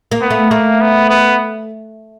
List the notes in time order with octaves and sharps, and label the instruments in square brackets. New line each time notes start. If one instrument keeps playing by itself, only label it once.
[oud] A#3
[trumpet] B3
[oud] A3
[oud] A3 [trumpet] A#3
[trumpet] B3
B3